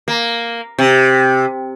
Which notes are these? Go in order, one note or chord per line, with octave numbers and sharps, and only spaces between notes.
A#3
C3